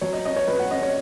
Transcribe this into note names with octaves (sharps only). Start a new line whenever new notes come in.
F#3 C#5
D#5
C#4 D#5
C#5
F#3 B4
F#5
C#4 D#5
C#5